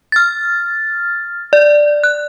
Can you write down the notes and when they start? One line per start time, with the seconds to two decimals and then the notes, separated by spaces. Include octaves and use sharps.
0.12 F6 A6
1.53 D5
2.04 F#6